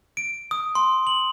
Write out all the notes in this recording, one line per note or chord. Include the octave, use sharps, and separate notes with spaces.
D7
D#6
C6
F#7